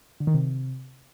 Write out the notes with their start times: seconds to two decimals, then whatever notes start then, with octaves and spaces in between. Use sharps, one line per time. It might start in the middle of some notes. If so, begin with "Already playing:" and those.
0.20 D3
0.27 D#3
0.34 C3